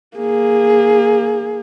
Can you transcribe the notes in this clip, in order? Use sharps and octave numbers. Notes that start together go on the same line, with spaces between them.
A#3 G#4